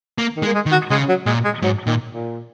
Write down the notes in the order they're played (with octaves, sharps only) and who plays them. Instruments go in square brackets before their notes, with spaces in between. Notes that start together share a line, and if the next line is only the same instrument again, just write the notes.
[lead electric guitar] A#3
[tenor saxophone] D#3
[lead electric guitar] G#3
[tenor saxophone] A#3
G#3
[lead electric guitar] D#3
[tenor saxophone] F#4
[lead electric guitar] C#3 [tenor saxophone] G#3
[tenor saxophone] F#3
[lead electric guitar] A#2 [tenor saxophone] G#3
[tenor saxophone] G#3
[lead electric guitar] G#2 [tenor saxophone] F#3
[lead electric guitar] A#2 [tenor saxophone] D#3
[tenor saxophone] A#2